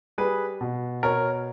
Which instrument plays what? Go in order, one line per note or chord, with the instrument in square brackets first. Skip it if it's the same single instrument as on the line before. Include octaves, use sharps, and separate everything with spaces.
[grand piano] G3 G#4 B4
B2
B2 A#4 C#5